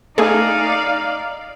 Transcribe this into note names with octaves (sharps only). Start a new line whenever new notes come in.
A3 D#4 G#4 D5 F5